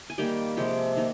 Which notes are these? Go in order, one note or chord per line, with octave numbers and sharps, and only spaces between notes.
G#5
D#3 G3 A#3 G5
C3 F3 G#3 G5
D#3 A#3